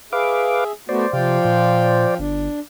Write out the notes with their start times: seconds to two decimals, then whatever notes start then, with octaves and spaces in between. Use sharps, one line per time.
0.13 G#4 B4 E5 F5 D6
0.89 A3 B3 F#4 C5 D5
1.13 C3 F3 F5 G5
1.45 A#2
2.19 G1 D4